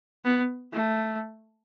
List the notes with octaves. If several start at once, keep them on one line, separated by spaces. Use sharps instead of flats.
B3
A3